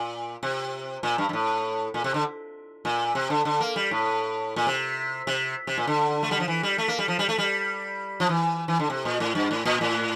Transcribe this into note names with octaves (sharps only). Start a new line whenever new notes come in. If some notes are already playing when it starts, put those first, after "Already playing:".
Already playing: A#2
C3
A#2
G2
G2
A2
A#2
C3
D3
A#2
C3
D3
D3
A#3
G3
A2
A#2
C3
C3
C3
A#2
D3
A3
G3
F3
E3
G3
A3
A#3
G3
F3
G3
A3
G3
F3
E3
E3
D3
C3
A#2
A2
G2
A2
A#2
A2